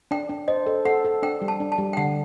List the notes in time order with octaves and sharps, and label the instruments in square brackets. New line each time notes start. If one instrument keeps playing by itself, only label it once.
[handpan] D4 [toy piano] G5
[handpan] D4
[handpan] C5 [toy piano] D#5
[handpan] A4
[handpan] A4 [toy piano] F#5
[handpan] A4
[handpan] D4 [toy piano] G5
[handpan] G3
[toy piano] A5
[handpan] D4
[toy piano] A5
[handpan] G3
[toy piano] G5
[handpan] D3 [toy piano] F#5